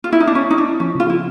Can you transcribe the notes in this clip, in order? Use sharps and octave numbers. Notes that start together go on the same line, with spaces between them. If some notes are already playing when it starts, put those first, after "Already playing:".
F4
E4
D#4
D4
C#4 E4
D#4 E4
D4
E4
F3 C#4
C#3 F4
E4